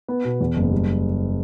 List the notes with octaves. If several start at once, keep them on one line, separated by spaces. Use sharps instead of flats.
B3
B2
E2
F#1
G3